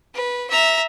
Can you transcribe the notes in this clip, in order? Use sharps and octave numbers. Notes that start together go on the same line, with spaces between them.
B4
E5 A#5